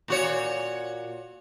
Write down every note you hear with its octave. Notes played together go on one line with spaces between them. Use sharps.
A#2 F#4 C#5